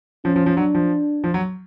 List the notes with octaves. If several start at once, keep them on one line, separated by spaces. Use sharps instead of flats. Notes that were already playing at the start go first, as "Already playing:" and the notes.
F3 C#4
F3
F3
F#3 D4
F3
F3
F#3